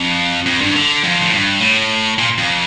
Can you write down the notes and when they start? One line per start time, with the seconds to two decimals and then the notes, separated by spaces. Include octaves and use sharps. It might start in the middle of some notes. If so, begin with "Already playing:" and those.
Already playing: F2
0.46 F2
0.61 G2
0.71 E3
0.75 D3
1.03 F2
1.21 A2
1.32 G2
1.61 A2
2.19 A#2
2.38 F2